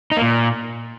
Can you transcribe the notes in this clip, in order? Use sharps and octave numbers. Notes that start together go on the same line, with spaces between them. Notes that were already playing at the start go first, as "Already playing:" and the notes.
D#4
A#3
A#2